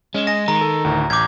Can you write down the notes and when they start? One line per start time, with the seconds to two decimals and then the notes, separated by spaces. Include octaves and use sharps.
0.14 G#3 C#4 D#5 E7
0.27 D#5 G#5 A#6
0.48 D#3 G#3 A#5
0.61 A4
0.85 D2 A2
1.10 A1 D6 G6 G#6